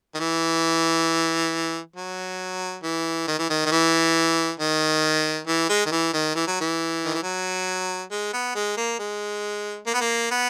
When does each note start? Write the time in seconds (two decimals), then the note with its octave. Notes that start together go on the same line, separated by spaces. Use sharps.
0.14 D#3
0.20 E3
1.96 F#3
2.83 E3
3.27 D#3
3.39 E3
3.50 D#3
3.65 D#3
3.71 E3
4.59 D#3
5.47 E3
5.69 G#3
5.85 D#3
5.91 E3
6.13 D#3
6.35 E3
6.47 F#3
6.60 E3
7.05 D#3
7.14 E3
7.23 F#3
8.11 G#3
8.33 B3
8.55 G#3
8.77 A#3
8.99 G#3
9.86 A#3
9.94 B3
10.01 A#3
10.31 B3